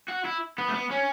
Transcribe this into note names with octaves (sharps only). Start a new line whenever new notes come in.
F#4
E4
B3
A3
B3
C#4